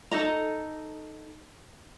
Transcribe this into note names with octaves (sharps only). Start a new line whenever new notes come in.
D#4 A4 D#5 A#5